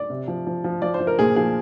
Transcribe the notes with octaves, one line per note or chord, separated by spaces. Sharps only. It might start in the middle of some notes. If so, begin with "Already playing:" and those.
Already playing: D5
C3
F3
F3
F3
F3 D5
C5
F3
A#4
A#2 G#4
F3 G#4